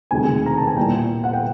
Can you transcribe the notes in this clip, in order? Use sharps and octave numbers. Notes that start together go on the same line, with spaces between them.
E1 D2 C3 D#3 G#3 G#5
A#5
A5
G#5
A#2 G3 B3 E4 G5
F#5
G5